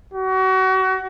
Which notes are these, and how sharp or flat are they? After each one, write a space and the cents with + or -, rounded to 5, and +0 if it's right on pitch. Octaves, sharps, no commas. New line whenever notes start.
F#4 +30